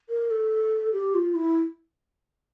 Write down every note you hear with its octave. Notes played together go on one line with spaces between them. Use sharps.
A#4
A4
G4
F4
E4